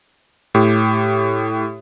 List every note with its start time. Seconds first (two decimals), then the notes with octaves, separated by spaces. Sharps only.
0.55 A2 G4